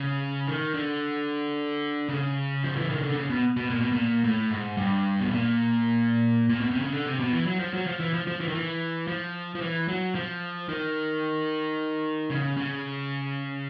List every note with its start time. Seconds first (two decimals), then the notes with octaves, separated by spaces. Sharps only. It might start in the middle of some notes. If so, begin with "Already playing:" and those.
Already playing: C#3
0.48 D#3
0.74 D3
2.09 C#3
2.64 F3
2.77 E3
2.90 D#3
3.03 D3
3.16 C#3
3.30 B2
3.57 B2
3.70 A#2
3.81 B2
3.92 A#2
4.24 A2
4.51 G#2
4.77 G2
5.20 B2
5.31 A#2
6.49 A#2
6.61 B2
6.71 C3
6.82 C#3
6.93 D3
7.06 C3
7.20 B2
7.33 E3
7.46 F#3
7.59 F3
7.73 F#3
7.87 F3
8.00 E3
8.13 F3
8.27 F3
8.40 E3
8.48 D#3
8.55 E3
9.08 F3
9.55 F3
9.61 E3
9.88 F#3
10.15 F3
10.69 D#3
12.30 C#3
12.57 C#3